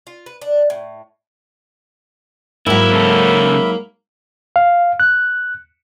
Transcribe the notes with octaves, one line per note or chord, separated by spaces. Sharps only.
F4
B4
D4
A2
G#2 F#3 A#3 E4 E5 B5
C#3 A4
F5
F#6